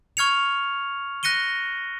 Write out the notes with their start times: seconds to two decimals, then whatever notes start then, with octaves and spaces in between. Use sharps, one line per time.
0.17 C#6 F6 G#6 C#7 F7
1.23 F#6 A#6 C#7 D#7 G7